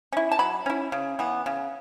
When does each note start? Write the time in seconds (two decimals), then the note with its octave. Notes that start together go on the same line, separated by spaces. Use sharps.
0.13 C#4 E4
0.32 A5
0.39 F#3 B5
0.66 C#4 E4
0.92 C#3
1.19 E3 B3
1.46 C#3